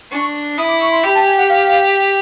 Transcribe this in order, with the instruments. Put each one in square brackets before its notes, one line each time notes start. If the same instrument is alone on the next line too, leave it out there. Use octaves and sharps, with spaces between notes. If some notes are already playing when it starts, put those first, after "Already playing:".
[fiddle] D4 [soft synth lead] C#6
[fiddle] E4 [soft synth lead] D#6
[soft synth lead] D6
C#6
C6
[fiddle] G4 [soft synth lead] B5
[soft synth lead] A5
G#5
F#5
F5